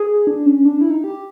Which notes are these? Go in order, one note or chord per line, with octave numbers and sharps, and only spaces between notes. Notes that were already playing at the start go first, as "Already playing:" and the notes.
Already playing: G#4
D4
C#4
D4
E4
D#4
G4